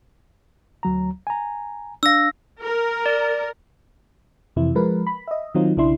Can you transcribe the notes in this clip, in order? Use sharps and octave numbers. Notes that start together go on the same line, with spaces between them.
D2 F#3 A#5
G#5 A#5
D4 F5 E6 A#6
A#4
D5
F2 C3 E3 E4
F3 G#3 A#4 B4
B5
D#5 E5
D#3 F#3 C4 D#4 F4
B1 C#3 D4 E4 C6